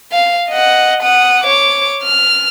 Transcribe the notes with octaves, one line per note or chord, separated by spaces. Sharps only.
F5
D#5 F#5
F#5 D#6
C#5 D6
F6